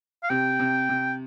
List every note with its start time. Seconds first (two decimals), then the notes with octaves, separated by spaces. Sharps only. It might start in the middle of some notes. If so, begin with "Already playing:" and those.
0.23 F5
0.30 C3 G5
0.59 C3
0.89 C3